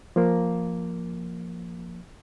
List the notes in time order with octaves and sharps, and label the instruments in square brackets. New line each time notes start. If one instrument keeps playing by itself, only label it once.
[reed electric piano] F3 A#3